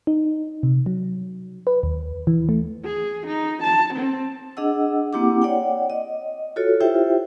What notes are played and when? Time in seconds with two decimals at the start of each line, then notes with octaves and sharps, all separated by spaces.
0.07 D#4
0.63 C3
0.86 F#3
1.67 B4
1.83 D#2
2.27 E3
2.49 A3
2.85 G#4
3.27 D#4
3.63 A5
3.94 C4
4.57 D4 G#4 D#5 F#5 E6
5.13 A#3 C4 E4 G4 F#5 D6
5.42 C#5 D5 F#5 G5
5.90 D#5
6.56 F4 F#4 A4 C#5
6.81 E4 F4 G4 C5 E5 G5